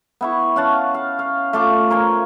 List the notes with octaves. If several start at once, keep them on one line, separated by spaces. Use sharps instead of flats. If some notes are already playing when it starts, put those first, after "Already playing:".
B3 E4 C#6
C#4 F5 F#5 A5
F5
F5
A3 F4 D6
A#4 C5 C#5 G#5